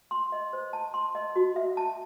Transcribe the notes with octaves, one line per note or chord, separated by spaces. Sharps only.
C6
D#5
C5
A5
C6
D#5
F#4
E5
A5